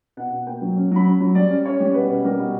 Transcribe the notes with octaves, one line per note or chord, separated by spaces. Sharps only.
B2 F#5
B2
A#3 G5
F#3
C#4
F#3 B5
C#4
F#3
G3 D5
C#4
C#4 C#5
G3
B2 B4
C#4
G3 A#4
B2